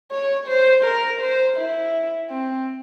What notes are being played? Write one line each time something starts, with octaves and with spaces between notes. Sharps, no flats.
C#5
C5
A#4
C5
E4
C4